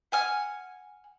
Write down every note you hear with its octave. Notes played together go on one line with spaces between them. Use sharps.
F#5 G#5 F6